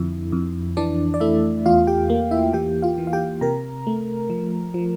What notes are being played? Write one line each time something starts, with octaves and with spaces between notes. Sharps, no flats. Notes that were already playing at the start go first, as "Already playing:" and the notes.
Already playing: F2 D3 E4
F2
E3 D4 D5
D5
A3 E4 E5
E2 F4 F5
G4 G5
A#3
E4 E5
E3 G4 G5
F4 F5
E3
F5
G4 G5
C3 A#4 A#5
A3
F3
F3